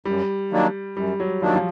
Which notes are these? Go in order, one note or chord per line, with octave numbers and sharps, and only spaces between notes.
F#2 G3
D#3 F#3 A#3 D4
F#2 G3
F#3
D#3 F3 F#3 A#3 D4
F3